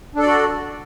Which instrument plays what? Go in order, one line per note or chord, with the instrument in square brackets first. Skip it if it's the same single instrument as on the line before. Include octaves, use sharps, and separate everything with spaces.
[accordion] D4
A4
D5
F#4